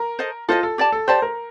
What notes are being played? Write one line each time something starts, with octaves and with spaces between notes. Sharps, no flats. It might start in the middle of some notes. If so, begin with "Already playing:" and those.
Already playing: A#4
A4 C5 D#5
F4 A4 C5 D#5
A4
G4 D5 A5
A4
G4 C5 D5 A5
A#4